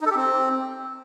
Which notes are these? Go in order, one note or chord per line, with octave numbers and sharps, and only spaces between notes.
D#4
A4
G4
C4